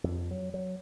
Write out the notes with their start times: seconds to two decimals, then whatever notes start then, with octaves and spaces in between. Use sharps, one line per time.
0.04 F2
0.31 F#3
0.54 F#3